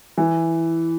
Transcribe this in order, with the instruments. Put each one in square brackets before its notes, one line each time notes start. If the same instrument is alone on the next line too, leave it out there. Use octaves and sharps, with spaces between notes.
[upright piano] E3